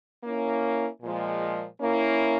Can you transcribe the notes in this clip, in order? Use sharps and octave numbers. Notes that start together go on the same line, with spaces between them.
A#3 C#4 E4
A#2 F3 G#3
A#3 C#4 E4